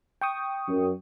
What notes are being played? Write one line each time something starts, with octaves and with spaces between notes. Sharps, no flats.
G5 C#6 D#6
F#2